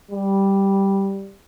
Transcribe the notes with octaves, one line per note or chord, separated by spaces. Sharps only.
G3